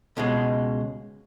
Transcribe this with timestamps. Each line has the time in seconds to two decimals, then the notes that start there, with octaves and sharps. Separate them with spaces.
0.17 C#2 B2 G#3